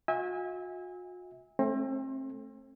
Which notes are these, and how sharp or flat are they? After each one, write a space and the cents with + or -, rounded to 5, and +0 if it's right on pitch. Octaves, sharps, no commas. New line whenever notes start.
F#4 -45 E5 -30 G#5 -30
A3 +0 C4 +35